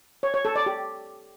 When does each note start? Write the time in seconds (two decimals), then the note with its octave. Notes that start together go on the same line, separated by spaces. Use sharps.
0.23 C#5
0.34 C#5
0.45 A4
0.56 D5
0.66 G4